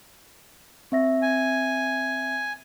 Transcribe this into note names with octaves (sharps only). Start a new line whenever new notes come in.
C4 E5 A#6
G#5